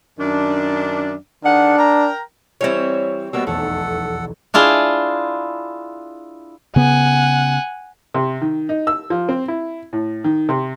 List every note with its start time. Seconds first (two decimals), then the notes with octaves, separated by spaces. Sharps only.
0.19 F#2 D#3 D4
1.45 D#3 D4 G#4 F#5
1.78 A#4 G5 A#5
2.61 E3 G3 C4 E4 C#5
3.33 B2 G3 A#3 B3 F#4 E6
3.47 F1 B1 E2 A3 A4 F#5
4.54 D4 E4 F4 G#4
6.76 C#3 B3 F#5 G#5
8.14 C3
8.41 D#3
8.69 D#4
8.87 E6
9.10 F3
9.29 C4
9.48 E4
9.93 A2
10.24 D#3
10.49 C3